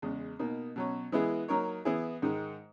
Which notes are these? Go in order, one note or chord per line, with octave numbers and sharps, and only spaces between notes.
E2 C#3 G#3
B2 A#3 D#4
B2 F#3 C#4
E3 G#3 B3 E4 G#4
F#3 A#3 D#4 A#4 C#5
E3 B3 E4 G#4
G#2 D#3 G#3